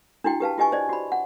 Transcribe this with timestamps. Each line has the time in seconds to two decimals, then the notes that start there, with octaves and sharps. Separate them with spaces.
0.24 D4 E4 F#4 G5
0.40 G4 B4 F5 A5
0.58 F4 G4 D#5 G#5 C#6
0.72 C5 D5 D#5
0.89 F#4 B5
1.12 F#5